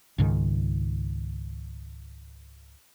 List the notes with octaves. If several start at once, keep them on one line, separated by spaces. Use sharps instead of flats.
C#2 G#2 D#3